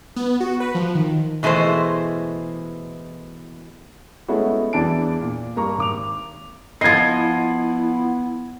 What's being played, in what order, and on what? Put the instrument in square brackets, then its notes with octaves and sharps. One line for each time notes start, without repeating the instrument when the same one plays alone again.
[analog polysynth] B3
F#4
B4
F3
D#3
[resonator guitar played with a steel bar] B2 E3 G#3 A3 C5
[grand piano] G#3 A3 B3 C#4 E4 F#4
E2 E3 D4 A5 D7
A#2
G2 A#3 A#5 C#6
G#1 D6 F7
[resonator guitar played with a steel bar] F3 D#5 [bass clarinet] B3 [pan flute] E4 [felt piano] G#6 C7